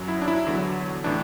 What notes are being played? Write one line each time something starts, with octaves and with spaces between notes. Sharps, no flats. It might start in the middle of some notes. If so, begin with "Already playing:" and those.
Already playing: F#2 F#3
E4
D4
E4
E2 D3 F#3
A2 E3 D4